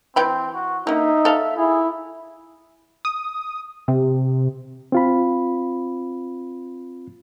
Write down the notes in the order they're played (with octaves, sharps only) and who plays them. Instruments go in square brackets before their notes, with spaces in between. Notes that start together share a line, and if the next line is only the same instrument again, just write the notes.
[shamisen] E3 G5 B5 [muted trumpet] C4
[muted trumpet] F#4
[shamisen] D3 A#3 [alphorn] D#4 [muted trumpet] E5
[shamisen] A4 F5
[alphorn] E4 [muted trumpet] G#4
[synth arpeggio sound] D#6
C3
[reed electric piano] C4 F4 B5